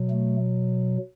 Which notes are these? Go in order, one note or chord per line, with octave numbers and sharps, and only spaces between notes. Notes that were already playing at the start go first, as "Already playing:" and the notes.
Already playing: B2 F#3
A3